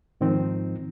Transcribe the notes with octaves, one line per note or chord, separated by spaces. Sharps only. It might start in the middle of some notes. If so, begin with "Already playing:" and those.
G#2 D#3 F3 C4 D#4